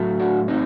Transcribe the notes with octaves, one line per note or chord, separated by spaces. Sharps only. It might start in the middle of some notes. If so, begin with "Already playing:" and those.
Already playing: A2 F#3 A3
D4 F#4
C4 D#4